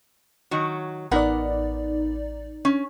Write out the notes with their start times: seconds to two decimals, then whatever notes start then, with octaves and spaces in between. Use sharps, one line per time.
0.51 D#3 F#3 F#4
1.11 A1 B3 D#4 A#4 D5 F#5
2.65 C#4